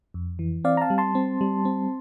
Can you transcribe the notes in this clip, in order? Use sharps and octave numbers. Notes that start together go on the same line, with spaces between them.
F2
E3
C4 D5 F5
A#5
F5 A5
G3
A5 C6
C4
G3
C4